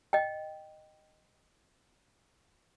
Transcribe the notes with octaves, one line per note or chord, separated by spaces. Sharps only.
D#5 G5